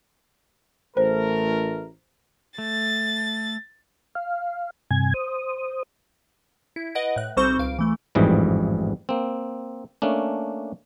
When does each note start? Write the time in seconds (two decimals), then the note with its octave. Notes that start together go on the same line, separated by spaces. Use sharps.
0.97 A1 A3 A#4 C5
2.58 A3 A6
4.15 F5
4.91 G2 C3 G#5 G#6
5.14 C5 D#6
6.76 E4
6.95 B4 D#5 F#5 A#6 D7
7.16 A2 F#6
7.37 B1 G3 C4 C5 C#6 G6
7.58 C#2 F5 D7
7.79 E3 A3
8.15 A1 F2 G#2 E3 G3
9.09 A#3 C4
10.02 A3 A#3 C#4 D4